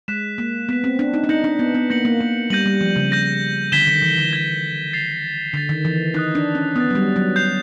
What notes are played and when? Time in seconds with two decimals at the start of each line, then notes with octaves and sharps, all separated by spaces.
0.08 G#3 F#6 B6 E7
0.38 A#3
0.69 B3 F#6 B6 E7
0.84 C4
0.99 D4
1.14 D#4
1.24 D4
1.29 D#4 G6 A#6 C#7 F#7
1.44 D4
1.59 B3
1.75 B3
1.90 A#3 G6 A#6 C#7 F#7
2.05 A#3
2.20 A#3
2.50 G3 G6 A#6 D#7 F#7
2.66 G3
2.81 F3
2.96 C#3
3.11 G6 A#6 D#7 F#7
3.72 D3 G#6 B6 E7 G7
3.87 D#3
4.02 E3
4.18 D3
4.33 G#6 B6 E7 G7
4.93 A6 C7 F7
5.54 D3 A6 C7 F7
5.69 D#3
5.85 E3
6.14 D#4 D#6 F#6 A6
6.35 D4
6.55 C#4
6.76 B3 D#6 F#6 A6
6.91 F#3
6.95 G3
7.16 F#3
7.36 G6 C7 F7